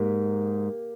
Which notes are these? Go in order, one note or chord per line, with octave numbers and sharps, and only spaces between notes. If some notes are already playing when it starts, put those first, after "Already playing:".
Already playing: G#2 A#3 G4